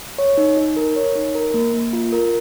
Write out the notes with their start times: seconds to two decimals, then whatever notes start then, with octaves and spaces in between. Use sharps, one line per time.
0.18 C#5
0.38 D#4
0.57 D#4
0.77 A#4
0.96 C#5
1.15 D#4
1.35 A#4
1.54 A#3
1.74 A#3
1.93 F4
2.13 A#4